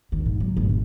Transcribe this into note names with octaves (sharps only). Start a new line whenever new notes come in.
D#3
G#2
F#3
G1
G1